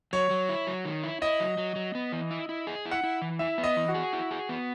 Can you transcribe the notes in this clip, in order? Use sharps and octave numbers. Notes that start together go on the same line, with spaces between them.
F#3 C#5
F#3
E4
F#3
D#3
E4
E4 D#5
F#3
F#3
F#3
B3
E3
E4
E4
G#4
E4
F#5
E4
E3
E4 E5
B3
D#5
E3
F#4
G#4
E4
G#4
B3